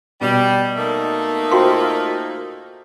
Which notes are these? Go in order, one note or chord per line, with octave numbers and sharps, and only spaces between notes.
B2 G3
A3 A#3 D#4
F4 F#4 C5 F5 G5 C6